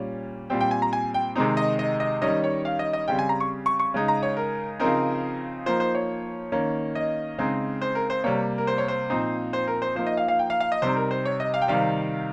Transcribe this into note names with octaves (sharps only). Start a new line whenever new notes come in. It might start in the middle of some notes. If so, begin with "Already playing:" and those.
Already playing: A#2 G3 C#4
A#2 G3 C4 G5
G5
G#5
A#5
G#5
G5
C3 D#3 G#3 C4 D#4
D#5
D#5
D#5
D#3 G3 C#4 D#5
C#5
F5
D#5
D#5
C#3 G3 C4 G5
G#5
A#5
C#6
C#6
C#6
C#3 G#3 D#4
A#5
C#5
A#4
C#3 F3 C4 D#4 A#4
F3 A#3 D#4 C5
C5
C#5
D#3 A#3 C#4
D#5
C#3 G#3 C4 D#4
C5
A#4
C5
C3 G3 A#3 C#5
A#4
C5
C#5
C5
A#2 F3 C4 D#4
C5
A#4
C5
F3 A#3 D#4 C5
D#5
F5
F5
G5
F5
F5
D#5
C3 G3 C4 D#4 C5
A#4
C5
C#5
D#5
F5
G5
C3 D#3 G3 F5